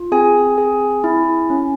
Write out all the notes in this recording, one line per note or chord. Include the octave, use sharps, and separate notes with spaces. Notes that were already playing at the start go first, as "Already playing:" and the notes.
Already playing: F4
C4 G#4 G#5
G#4
E4
C#4